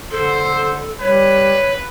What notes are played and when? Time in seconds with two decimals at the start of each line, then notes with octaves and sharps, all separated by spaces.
0.11 D3 A4 C5
1.00 G3 B4 C#5